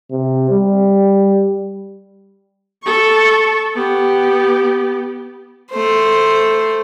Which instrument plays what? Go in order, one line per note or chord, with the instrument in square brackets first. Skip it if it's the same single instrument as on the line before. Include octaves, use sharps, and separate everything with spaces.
[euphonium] C3
G3
[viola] A4 C#6
B3 G4
[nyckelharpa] A3 C5